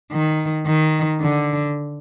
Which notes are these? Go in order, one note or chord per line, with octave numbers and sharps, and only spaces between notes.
D#3
D#3
D3